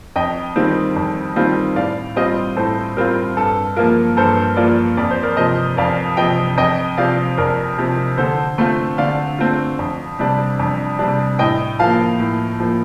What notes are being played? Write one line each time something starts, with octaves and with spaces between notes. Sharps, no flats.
F2 D#5 G5
D#3 G3 C4 F4
F2
D#3 G3 C4 F4
A2 D5 F5
G3 C4 F4 C5 D#5
A2 A4 C5
G3 C4 F4 A#4
G2 A4
F3 A#3 F4 A#4
G2 A4 C5
F3 A#3 F4 A#4 D5
F2 D5
C5
A#4 D5
C3 F3 C5 D#5
F2 D5 F5
C3 F3 D#5 G5
F2 D#5 G5
C3 F3 C4 D5 F5
F2 A#4 D5
C3 F3 C4
D3 A4 C5
A3 C4 F4
D3 D5 F5
A3 C4 F4
F2
C3 G3 D4
F2
C3 G3 D4
A2 D#5 G5
F3 A#3 F5 A5
A2
F3 A#3